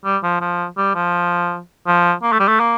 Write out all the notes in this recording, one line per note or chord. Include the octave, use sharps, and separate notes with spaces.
G3
F3
F3
G3
F3
F3
A#3
A3
G3
A3
A#3